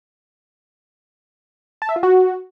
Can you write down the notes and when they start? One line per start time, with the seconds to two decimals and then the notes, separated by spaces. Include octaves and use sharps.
1.82 A5
1.89 E5
1.96 F4
2.03 F#4